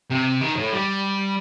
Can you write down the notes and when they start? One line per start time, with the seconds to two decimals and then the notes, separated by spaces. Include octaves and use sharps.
0.10 C3
0.41 D#3
0.56 A2
0.72 G3